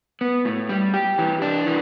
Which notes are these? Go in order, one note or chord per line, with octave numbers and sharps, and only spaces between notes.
B3
A2
G3
G4
E3
D4
E3